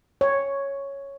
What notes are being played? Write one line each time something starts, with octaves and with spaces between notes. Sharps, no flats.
C#5